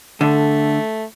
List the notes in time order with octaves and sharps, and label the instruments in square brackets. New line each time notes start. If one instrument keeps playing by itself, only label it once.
[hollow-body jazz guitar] D3 [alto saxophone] A3